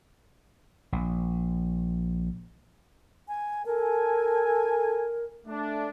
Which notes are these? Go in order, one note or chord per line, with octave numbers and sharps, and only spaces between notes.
A#1
G#5
A4 A#4 G#5
A3 D4